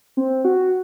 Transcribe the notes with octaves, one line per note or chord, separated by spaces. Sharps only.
C4
F#4